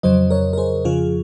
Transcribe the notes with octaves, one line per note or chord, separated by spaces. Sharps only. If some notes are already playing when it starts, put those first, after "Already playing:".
F2 C#3 F#3 C5 D#5
A#4 C#5
A#4
G#4 C5
F2 C#3 F3 F4 G#4